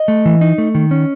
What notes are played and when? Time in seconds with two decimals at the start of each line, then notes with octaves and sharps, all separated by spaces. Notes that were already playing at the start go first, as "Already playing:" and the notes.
Already playing: D#5
0.08 A3
0.25 E3
0.41 D#4
0.58 A3
0.75 D#3
0.91 C#4